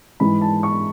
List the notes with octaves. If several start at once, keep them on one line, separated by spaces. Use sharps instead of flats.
G#2 E3 G#3 B5
A5
C#6